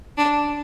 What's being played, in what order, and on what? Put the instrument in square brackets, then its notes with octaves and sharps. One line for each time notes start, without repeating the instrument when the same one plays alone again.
[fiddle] D4